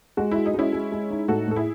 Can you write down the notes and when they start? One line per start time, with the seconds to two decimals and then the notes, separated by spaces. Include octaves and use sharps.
0.17 G#3 F#4
0.31 E4 F#4
0.46 D#4
0.54 G#3 C#4 E4
0.73 G#3
0.92 G#3
1.11 D#4
1.28 A2 F#4 A4
1.47 A2 A4
1.56 E4 G#4